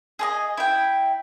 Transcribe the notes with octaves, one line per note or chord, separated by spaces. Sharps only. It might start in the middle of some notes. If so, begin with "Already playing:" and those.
G#4 B4 D#5
E4 G5